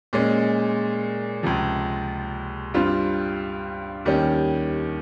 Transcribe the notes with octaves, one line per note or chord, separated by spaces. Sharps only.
A#2 G#3 C#4
C#2 C3 F3
G2 G3 C4 F4
D#2 D#3 G3 C#4